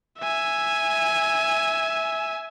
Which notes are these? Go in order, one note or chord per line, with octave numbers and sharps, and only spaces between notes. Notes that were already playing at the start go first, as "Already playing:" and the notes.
E5 G#5